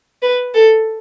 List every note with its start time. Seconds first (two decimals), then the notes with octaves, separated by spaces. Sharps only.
0.22 B4
0.54 A4